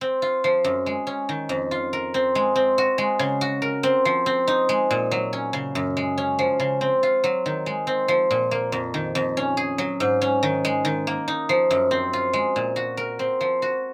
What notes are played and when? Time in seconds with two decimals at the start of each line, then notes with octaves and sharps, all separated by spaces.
0.01 C4
0.22 F4
0.44 F3
0.64 F#2
0.86 G#3
1.07 C#4
1.29 D#3
1.49 F2
1.71 F4
1.93 A#4
2.14 C4
2.35 G#3
2.56 C4
2.78 F#4
2.98 G#3
3.19 C#3
3.41 F#4
3.62 A#4
3.83 C4
4.05 F3
4.26 C4
4.47 D#4
4.69 G#3
4.91 A#2
5.11 F#3
5.33 C#4
5.53 C#3
5.75 F#2
5.97 G#3
6.18 C#4
6.39 F3
6.60 C#3
6.81 C4
7.03 F4
7.24 F#3
7.46 D#3
7.66 G#3
7.87 C4
8.08 F3
8.31 A#2
8.51 A#3
8.72 F2
8.94 D#3
9.15 F2
9.37 C#4
9.57 G#4
9.78 F#3
10.00 G#2
10.22 C#4
10.43 D#3
10.65 G#3
10.85 D#3
11.07 A#3
11.28 D#4
11.49 F3
11.71 F#2
11.91 C4
12.13 F4
12.33 G#3
12.56 A#2
12.76 F#4
12.97 A#4
13.19 C4
13.41 F3
13.62 F#4